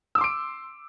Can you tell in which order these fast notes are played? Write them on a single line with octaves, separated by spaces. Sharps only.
E6 D6 C6 D7